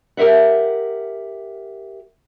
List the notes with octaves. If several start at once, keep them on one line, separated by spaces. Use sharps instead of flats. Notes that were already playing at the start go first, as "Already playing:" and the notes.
G4 A#4 C5 E5 F#5